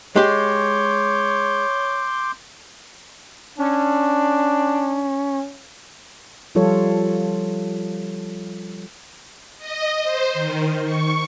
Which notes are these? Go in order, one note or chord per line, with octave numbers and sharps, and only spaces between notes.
G#3 G4 C#5 C6 D6 G6
C#4 D4
F3 G3 F4 A4 C#5
D#5
C5
D#3
C#6